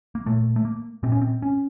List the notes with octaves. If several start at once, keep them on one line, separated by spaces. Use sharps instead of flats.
A#3
A#2 A3
A3
A#3
A#2 C4
C#4
C4
C#4